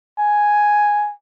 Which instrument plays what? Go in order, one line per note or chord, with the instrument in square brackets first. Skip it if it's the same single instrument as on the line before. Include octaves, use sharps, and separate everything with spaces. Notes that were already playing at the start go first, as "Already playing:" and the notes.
[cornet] G#5